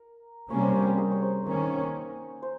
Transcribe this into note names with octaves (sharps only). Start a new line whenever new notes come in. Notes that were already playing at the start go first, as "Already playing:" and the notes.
Already playing: A#4
C3 G3 A#3 C#4 C#5
A#4 C5
C5
A#4
G#4
C#5
C5
D#3 A#3 C#4 A#4
C5